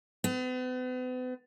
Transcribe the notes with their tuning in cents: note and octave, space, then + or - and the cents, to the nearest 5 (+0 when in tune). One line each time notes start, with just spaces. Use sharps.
B3 +40